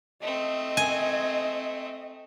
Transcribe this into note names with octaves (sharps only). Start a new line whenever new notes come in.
A3 C4 D#5
G#5